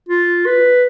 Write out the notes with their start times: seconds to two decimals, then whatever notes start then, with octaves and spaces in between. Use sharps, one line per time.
0.08 F4
0.46 B4